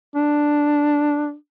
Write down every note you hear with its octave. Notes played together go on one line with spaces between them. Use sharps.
D4